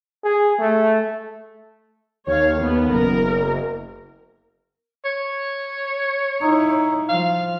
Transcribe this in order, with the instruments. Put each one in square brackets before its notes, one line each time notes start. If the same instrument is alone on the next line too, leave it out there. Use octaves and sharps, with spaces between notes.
[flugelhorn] G#4
A3
[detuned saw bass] D#2 [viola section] C#5 F5
[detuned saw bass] D#2 [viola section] B3
[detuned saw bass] F#1 [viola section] A#4
[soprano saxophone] C#5
[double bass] D#4 E4
[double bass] F3 [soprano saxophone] F5